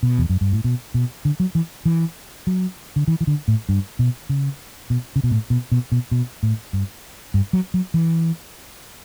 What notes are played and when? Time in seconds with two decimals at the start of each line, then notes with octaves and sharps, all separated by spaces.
0.03 B2
0.18 E2
0.29 F#2
0.41 G2
0.53 A2
0.64 B2
0.94 B2
1.25 D3
1.40 F#3
1.55 E3
1.85 E3
2.47 F#3
2.96 D3
3.08 E3
3.21 E3
3.27 D3
3.48 A2
3.69 G2
3.99 B2
4.29 C#3
4.90 B2
5.16 C#3
5.24 B2
5.31 A2
5.50 B2
5.72 B2
5.92 B2
6.11 B2
6.43 A2
6.73 G2
7.34 G2
7.53 F#3
7.74 F#3
7.94 E3